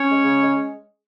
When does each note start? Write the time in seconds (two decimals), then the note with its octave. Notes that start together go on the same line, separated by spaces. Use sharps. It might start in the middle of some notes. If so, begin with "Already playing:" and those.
Already playing: C#4 C#5
0.09 G#3
0.24 C#3
0.41 G#3